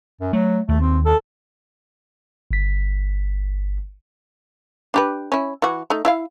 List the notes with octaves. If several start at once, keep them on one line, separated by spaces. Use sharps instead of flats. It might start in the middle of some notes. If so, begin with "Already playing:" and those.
F#2
F#3 A3
D#2 A3
C4
A4
G1 B6
D4 G4 B4
C#4 E4
E3 F#4
A3 D#4
E4 E5 F5